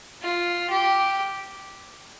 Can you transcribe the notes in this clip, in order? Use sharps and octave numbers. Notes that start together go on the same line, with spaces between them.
F4
G4